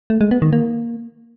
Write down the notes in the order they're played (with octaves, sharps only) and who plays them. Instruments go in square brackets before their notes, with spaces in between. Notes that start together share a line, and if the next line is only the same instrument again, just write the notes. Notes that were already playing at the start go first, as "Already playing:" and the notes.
[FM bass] A3
G#3
B3
D#3
A#3